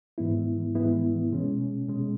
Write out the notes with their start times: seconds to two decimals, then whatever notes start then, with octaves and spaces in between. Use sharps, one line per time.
0.18 G#2 E3 G#3 B3 E4
0.75 G#2 E3 G#3 B3 E4
1.32 B2 G#3 C#4
1.88 B2 G#3 C#4